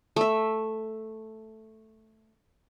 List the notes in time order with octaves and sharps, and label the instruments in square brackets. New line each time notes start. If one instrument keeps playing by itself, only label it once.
[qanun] A3 E5